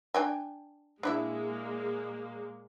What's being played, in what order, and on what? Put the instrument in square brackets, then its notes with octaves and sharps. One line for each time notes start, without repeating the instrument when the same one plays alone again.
[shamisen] D4 G5 G#5
[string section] A#2 G#3 A#3 [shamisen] D4 E4 E5